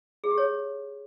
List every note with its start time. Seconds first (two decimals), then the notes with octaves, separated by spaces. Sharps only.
0.24 G#4
0.31 G4
0.38 C#5